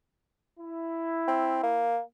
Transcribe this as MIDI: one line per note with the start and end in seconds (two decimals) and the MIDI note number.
0.59 1.98 64
1.28 1.63 60
1.63 2.00 58